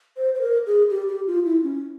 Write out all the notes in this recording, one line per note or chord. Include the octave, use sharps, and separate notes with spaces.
C5
C5
A#4
G#4
G4
G4
F4
E4
C#4